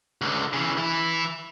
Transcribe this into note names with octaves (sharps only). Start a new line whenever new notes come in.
C#2 D3
C#3 E3
E3 E4